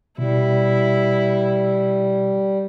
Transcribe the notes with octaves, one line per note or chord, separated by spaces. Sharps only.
B2 G3 E4